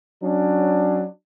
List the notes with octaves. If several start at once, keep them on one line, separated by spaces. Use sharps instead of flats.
F#3 C#4 D4